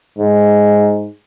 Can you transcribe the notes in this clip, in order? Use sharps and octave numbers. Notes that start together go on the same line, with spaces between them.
G#2